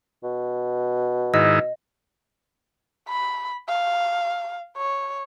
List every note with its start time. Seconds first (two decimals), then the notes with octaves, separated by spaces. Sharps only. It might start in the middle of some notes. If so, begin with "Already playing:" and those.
0.24 B2
1.34 G#2 D#3 E4 D#5
3.08 B5
3.68 F5
4.77 C#5